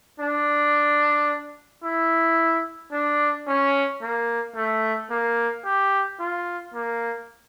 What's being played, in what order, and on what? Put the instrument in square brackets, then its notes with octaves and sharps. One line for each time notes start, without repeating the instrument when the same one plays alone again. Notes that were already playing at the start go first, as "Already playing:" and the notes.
[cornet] D4
E4
D4
C#4
A#3
A3
A#3
G4
F4
A#3